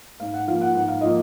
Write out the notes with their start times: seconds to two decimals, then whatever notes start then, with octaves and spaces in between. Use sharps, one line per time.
0.20 G#2 F5
0.34 F#5
0.47 F3 A#3 F5
0.61 F#5
0.75 G#2 F#5
0.88 F5
1.01 F3 A#3 D#5